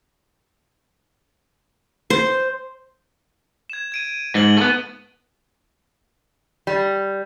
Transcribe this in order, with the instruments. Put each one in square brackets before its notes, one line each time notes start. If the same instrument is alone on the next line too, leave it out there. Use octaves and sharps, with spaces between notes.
[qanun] C5
[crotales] G#6 E7
G#6 D7 D#7
[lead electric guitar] G#2 [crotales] F#7 G7
[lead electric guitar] A3 B3
[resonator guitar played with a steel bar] G3